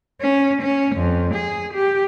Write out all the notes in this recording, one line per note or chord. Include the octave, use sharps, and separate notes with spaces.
C#4
C#4
F2
G#4
G4